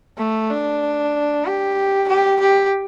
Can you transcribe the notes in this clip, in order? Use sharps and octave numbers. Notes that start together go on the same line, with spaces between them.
A3
D4
G4
G4
G4